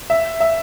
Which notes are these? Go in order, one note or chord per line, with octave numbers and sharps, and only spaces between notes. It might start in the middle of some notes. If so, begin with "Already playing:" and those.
E5
E5